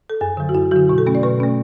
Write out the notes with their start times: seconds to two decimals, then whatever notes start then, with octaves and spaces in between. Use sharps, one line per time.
0.10 A4
0.21 F#2 G#4
0.37 D3 F#3
0.49 F#4
0.55 F#2 E4
0.71 D3 F#3 F#4
0.89 B2
0.98 A4
1.06 A3 C#4
1.15 D5
1.23 B2 B4
1.40 A3 C#4